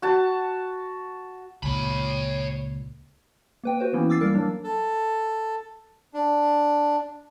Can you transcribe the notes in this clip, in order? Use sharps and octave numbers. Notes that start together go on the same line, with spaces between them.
F#4 A5
C#2 A#2 C#5 B5
A#3 B4 G5
F#4 B4 C5
E3 A#3 B3 C#4 E4
D6 E6 A6 C7
G3 A#3 A#4
F#3 A#3 D4
A4
D4